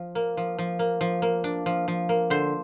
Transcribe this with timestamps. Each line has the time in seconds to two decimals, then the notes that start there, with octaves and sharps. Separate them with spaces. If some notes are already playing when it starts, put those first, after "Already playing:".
Already playing: F3
0.15 A#3
0.37 F3
0.58 F3
0.79 A#3
1.01 F3
1.22 A#3
1.44 D4
1.66 F3
1.88 F3
2.09 A#3
2.30 D3 C5